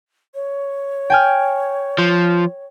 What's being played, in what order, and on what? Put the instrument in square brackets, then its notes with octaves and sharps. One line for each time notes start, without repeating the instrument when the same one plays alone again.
[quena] C#5
[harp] G5 G#5 F6
[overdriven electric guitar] F3